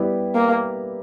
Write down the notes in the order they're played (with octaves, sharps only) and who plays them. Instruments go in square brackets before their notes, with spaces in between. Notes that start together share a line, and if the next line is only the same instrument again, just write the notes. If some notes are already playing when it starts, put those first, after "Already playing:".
Already playing: [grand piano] G3 B3 E4 G4
[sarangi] A#3